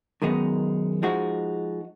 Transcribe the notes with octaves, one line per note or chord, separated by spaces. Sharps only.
F#2 D#3 G#3 B3 D#4
F3 G#3 D#4 F#4